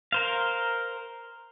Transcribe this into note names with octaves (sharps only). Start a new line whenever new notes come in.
A#4 C5 F5